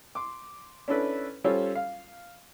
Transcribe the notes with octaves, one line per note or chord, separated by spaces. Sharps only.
C6 D6
C#4 D4 E4 A4 B4
G3 C#4 F4 A4 C5 C#5
F5